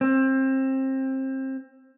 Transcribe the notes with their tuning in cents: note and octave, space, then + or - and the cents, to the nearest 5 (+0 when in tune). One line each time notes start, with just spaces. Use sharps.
C4 +25